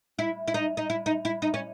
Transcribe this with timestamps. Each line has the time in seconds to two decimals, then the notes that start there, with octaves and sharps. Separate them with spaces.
0.19 E4
0.47 E4
0.54 D#4
0.77 D#4
0.90 E4
1.06 D#4
1.25 E4
1.42 D#4
1.54 C#4